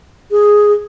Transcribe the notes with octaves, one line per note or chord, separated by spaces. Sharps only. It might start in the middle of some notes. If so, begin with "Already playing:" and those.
G#4